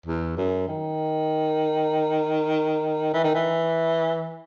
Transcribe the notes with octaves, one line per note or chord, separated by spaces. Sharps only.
E2
F#2
D#3
E3
D#3
E3